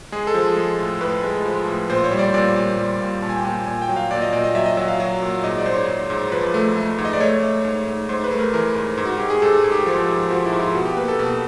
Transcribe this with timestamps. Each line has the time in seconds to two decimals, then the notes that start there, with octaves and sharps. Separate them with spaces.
0.12 G#3 G#4
0.27 A4
0.34 F3
0.57 G#3
0.78 A2
1.01 A2 B4
1.23 G#3
1.45 F3
1.67 A2
1.89 A#2 C5
2.04 C#5
2.11 G3
2.19 D5
2.34 A#2 D5
2.56 A#2
2.78 G3
3.01 A#2
3.22 A#2 A5
3.29 G#5
3.37 G5
3.44 A#2 G#5
3.66 A#2 G#5
3.82 G5
3.89 F#3
3.96 F5
4.11 A#2 D5
4.22 D#5
4.33 A#2 D5
4.44 D#5
4.54 F#3 E5
4.66 D#5
4.77 F#3 E5
4.88 F5
5.00 F#3
5.22 A#2
5.44 G#2 D#5
5.58 D5
5.66 G#2 C5
5.73 C#5
5.88 G#2
6.10 G#2
6.32 F3 B4
6.54 A3
6.76 A3
6.98 G#2
7.05 D#5
7.13 D5
7.20 A3 C#5
7.43 A3
7.65 G#2
7.87 G#2
8.09 G#2 C5
8.24 B4
8.31 A3
8.39 A#4
8.54 E3 A#4
8.75 G#2
8.98 G#2
9.06 F#4
9.18 G#2 G4
9.30 G#4
9.42 G#2 A4
9.64 G#2
9.72 G4
9.86 F3
10.09 G#2
10.30 F3 F#4
10.45 E4
10.53 G#2
10.60 F4
10.75 B2 F#4
10.86 G4
10.97 A#3 B4
11.08 A4
11.19 B2